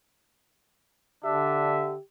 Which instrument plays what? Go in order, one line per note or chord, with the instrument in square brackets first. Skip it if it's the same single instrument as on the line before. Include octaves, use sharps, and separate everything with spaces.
[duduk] D3 [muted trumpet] D4 [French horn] G4 [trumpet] E5